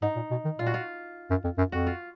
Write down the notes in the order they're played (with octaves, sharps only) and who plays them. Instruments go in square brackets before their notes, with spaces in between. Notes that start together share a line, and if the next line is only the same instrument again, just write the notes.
[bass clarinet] G#2 [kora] D#4
[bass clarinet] A#2
B2
D#3
[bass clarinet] A#2 [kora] F4
[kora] F#4
F4
[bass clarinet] F#2
F2
F#2
[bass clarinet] F2 [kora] F#4
[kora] F4